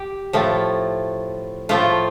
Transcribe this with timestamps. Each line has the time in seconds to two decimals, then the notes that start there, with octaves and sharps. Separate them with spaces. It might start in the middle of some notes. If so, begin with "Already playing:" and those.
Already playing: G4
0.33 A2 F3 A3
1.69 A2 F3 A3 F4